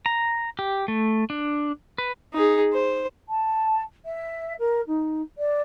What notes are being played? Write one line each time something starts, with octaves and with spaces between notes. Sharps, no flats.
A#5
G4
A3
D4
B4
D#4 G#4
C5
A5
E5
A#4
D#4
D5